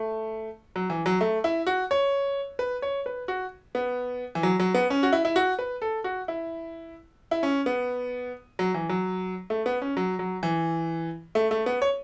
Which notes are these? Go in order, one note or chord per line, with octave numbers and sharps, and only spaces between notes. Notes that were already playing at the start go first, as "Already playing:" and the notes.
Already playing: A3
F#3
E3
F#3
A3
E4
F#4
C#5
B4
C#5
B4
F#4
B3
E3
F#3
F#3
B3
C#4
F#4
E4
E4
F#4
B4
A4
F#4
E4
E4
C#4
B3
F#3
E3
F#3
A3
B3
C#4
F#3
F#3
E3
A3
A3
B3
C#5